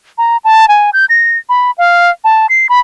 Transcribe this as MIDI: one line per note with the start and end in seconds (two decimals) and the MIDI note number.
0.18 0.37 82
0.44 0.68 81
0.68 0.90 80
0.93 1.05 91
1.09 1.38 94
1.49 1.71 83
1.78 2.11 77
2.24 2.47 81
2.49 2.67 96
2.69 2.80 83